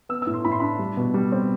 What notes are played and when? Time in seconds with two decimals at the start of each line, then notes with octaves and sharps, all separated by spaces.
0.09 B3 E6
0.22 E6
0.27 A2
0.34 C6
0.45 A2 B5
0.52 C6
0.60 D4 B5
0.79 G3
0.97 B2
1.14 G3
1.32 C4